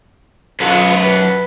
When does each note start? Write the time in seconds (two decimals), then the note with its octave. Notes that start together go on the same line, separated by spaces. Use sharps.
0.60 F#2 B3 F4 G#4 A4
0.91 B4